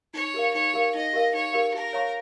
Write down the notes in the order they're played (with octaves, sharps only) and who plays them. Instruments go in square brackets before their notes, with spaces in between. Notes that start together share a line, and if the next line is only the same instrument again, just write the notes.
[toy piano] D#4 [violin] C#5
[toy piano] G4 A#4 F5
[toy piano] D#4 [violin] C#5
[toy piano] G4 A#4 F5
[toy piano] D#4 [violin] D#5
[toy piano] G4 A#4 F5
[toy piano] D#4 [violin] C#5
[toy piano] G4 A#4 F5
[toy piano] G4 [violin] A#4
[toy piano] C#5 F5 A#5 C#6